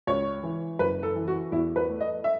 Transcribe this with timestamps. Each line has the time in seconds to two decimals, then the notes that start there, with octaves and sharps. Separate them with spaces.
0.07 C#2 C#5
0.43 E3
0.79 F#1 B4
1.03 A4
1.15 E3
1.27 F#4
1.52 E2 E4
1.76 B4
1.89 A3
2.00 D#5
2.24 E5